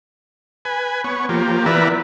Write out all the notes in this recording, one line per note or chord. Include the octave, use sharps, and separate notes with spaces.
B4 G#5
B3 C#5
F3 A#3 G4
E3 B3 A#4 B4 D5 E5